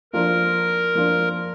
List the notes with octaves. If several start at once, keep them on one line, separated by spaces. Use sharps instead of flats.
F3 A#3 D4 F4 A#4
F3 A#3 D4 F4